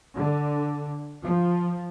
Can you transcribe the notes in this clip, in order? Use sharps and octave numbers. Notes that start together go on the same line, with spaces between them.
D3
F3